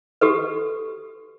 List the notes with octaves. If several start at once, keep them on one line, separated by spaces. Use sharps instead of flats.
F#4 G4 A4 B4